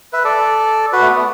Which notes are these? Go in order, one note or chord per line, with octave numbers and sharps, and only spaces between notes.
B4 E5
A4 D5
F#4 B4
A3
B3